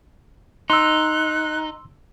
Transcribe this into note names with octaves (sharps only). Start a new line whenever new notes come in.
D#4 C6 E6 F#6